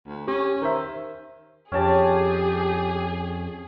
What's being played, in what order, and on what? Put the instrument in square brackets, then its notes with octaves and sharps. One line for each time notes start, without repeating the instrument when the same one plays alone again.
[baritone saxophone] D2
[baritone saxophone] C#4 [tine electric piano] G4
[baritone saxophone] D#3 [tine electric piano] A#4 C5 E5
[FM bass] F2 [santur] C#4 G5 A5 [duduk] G4 [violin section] G#4